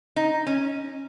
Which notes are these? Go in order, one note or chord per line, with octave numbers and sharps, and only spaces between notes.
D#4
C#4